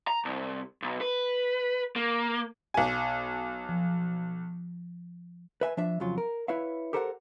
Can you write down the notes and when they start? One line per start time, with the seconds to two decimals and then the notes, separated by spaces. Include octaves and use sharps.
0.07 A#5
0.25 C2
0.82 B1
1.01 B4
1.96 A#3
2.74 B1 G#5
3.69 F3
5.61 B4 E5 G#5
5.77 F3 D4 E5
6.00 F2 C#3 F#3 F4
6.18 A#4
6.48 E4 B4 C#5 E5 F5
6.93 G4 A4 A#4 C5 D#5 F#5